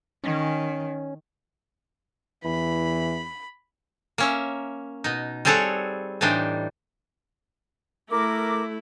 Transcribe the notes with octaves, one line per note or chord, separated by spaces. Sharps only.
D#3 C#4
E2 E3 B5
A#3 C#4 E5
B2 D#4
G3 C4 G#4 A4 C#5 F#5
A2 E3 G3 D4 D#4 C5
A3 E4 A#4 D6